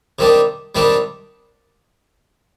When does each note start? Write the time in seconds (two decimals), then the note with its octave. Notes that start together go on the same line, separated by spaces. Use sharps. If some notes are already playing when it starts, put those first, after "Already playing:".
0.19 C3 D#3 G3 D4
0.75 C3 D#3 G3 D4